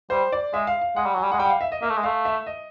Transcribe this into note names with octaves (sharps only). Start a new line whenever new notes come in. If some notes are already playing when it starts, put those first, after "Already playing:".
G3 C5
D5
G#3 E5
F5
F5
G#3 F#5
G3
F#3 G#5
G3
G#3 F#5
G3 G5
F#5
F5
E5
D#5
A#3 E5
A3
G#3
A3 F5
E5
D#5